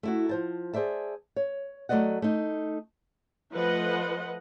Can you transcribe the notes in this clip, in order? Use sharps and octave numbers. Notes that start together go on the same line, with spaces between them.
A3 E4 F#4
F3 C5 A5
G#4 C5 D5 E5 A5
C#5
F#3 A3 C#4 D5 D#5 F#5
A3 D#4
F3 A3 B4 D#5 F#5